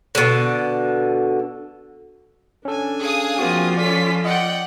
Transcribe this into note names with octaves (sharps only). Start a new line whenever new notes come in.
B2 D3
C#4 D4 A4 G#5
G#4 F5 D#6
F3 A#3 C4 F4 F#4
C#4 A4 D5 B6
D5 D#5 F#5 G5